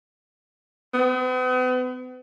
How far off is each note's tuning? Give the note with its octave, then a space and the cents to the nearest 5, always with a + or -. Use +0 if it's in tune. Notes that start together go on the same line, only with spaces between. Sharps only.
B3 +45